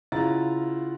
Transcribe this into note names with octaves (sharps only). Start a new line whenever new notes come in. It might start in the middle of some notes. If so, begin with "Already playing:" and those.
C#3 E4 F4 F#5 A#5 A6